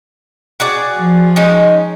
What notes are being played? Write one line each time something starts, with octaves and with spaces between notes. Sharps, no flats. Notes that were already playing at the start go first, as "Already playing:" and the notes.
F#4 G#4 D5
F3
G#3 C#4 D#4